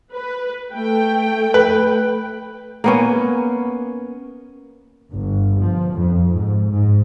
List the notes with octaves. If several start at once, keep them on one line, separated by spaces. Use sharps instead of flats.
B4
A3 G5
B4
A#3 B3 C#4
G1
F3
F2
G#2
G#2